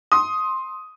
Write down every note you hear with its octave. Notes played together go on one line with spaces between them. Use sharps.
C6 D#6